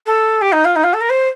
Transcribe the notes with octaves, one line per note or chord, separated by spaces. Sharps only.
A4
G4
D#4
F4
D#4
F4
A4
A#4
C5